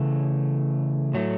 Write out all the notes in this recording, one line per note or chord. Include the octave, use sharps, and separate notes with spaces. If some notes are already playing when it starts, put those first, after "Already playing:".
Already playing: C#3 E3 A3
A2 F#3 A3